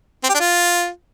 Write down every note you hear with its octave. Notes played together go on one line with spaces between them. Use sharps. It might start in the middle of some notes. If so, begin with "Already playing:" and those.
C4
G4
D4
F4